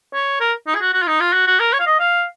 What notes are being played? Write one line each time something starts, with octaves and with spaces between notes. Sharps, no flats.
C#5
A#4
D#4
G#4
F#4
F#4
F4
D#4
F4
F#4
F#4
A#4
C#5
F5
D#5
F5